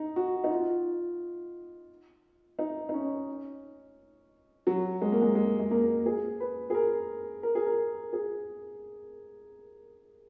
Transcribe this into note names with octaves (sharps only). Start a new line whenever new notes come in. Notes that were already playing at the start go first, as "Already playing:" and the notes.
Already playing: D#4
F#4
D#4
F4
D#4
D#4
C#4
F#3
G#3
A#3
G#3
G#3
G#3
A#3
G#4
B4
G#4
A#4
A#4
G#4
A#4
G#4